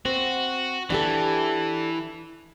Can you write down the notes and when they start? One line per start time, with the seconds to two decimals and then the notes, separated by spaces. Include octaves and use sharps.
0.05 C4 F#4
0.90 E3 D4 G4 A4